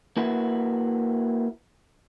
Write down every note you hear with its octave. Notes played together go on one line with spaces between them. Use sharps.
A#3 E4 F#4 B4